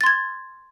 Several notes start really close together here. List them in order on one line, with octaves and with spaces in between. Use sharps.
A6 C6 G#6